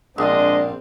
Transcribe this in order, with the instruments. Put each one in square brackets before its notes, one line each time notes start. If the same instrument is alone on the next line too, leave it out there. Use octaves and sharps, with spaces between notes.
[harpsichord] A#1 [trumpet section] G#3 D4 D#5 [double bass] C4